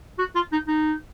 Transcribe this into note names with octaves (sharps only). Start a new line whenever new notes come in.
F#4
F4
D#4
D#4